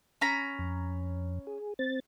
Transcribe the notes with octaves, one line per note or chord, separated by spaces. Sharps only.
C#4 A#5 B5
F2
G#4
C4 A6